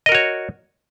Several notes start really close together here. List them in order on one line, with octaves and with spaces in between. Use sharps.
D#5 A#4 F#4 C#5